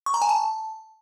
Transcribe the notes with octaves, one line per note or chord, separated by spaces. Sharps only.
C#6
A#5
G#5
A5